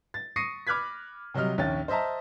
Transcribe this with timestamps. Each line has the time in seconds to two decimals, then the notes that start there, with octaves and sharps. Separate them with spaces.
0.14 A6
0.36 C#6 D#6 A#6 C7 C#7 D#7
0.67 B5 D6 F6 F#6 G#6 B6
1.34 C3 F#3 G3 D#5 F6
1.58 A#1 D#2 C#4 G5 A6
1.88 C5 D#5 E5 A5 A#5